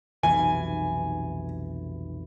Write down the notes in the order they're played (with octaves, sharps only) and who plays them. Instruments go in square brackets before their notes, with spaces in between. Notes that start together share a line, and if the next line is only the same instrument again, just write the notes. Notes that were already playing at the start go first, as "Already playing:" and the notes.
[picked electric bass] F1 B1 E3 [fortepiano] G#5